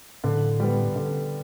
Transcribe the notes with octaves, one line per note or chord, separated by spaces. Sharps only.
A2 D3
G3 B3
D3